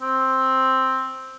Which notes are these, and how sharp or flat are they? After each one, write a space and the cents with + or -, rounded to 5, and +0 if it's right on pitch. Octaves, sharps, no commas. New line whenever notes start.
C4 +5